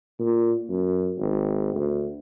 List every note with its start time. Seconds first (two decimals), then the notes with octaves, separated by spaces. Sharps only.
0.19 A#2
0.69 F#2
1.17 G#1
1.74 D2